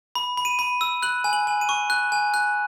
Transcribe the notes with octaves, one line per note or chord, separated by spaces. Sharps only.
B5
B5
D#7
B5
E6
F#6 F#7
G#5
F#7
G#5
D#7
C#6
F#6
G#5
F#6